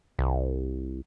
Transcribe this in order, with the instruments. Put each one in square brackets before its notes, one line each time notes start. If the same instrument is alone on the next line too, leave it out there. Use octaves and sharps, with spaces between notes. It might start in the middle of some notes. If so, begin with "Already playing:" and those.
[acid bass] C2